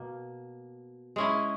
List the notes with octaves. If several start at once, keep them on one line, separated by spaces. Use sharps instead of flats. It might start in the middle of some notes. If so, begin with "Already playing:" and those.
Already playing: B2 A#3
G#3 C#4 E4